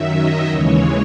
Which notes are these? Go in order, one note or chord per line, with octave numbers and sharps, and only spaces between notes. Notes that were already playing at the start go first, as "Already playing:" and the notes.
Already playing: F#2 D#3 F#3 E5
D#5
D#2 C#3 E3 G#3 C#5